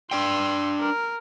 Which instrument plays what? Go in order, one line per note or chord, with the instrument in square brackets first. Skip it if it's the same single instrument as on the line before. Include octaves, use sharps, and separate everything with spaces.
[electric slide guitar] D4 D5 G5 [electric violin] C6 E6
[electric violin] A#4